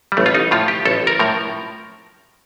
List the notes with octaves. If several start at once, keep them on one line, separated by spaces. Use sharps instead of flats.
G3
A1 A3
F4
D#4
A2 F3 F4
G4
A1 A4
A#4
A2 F3 A#4